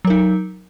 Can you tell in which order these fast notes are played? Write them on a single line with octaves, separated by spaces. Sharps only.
F#3 A#4 D#4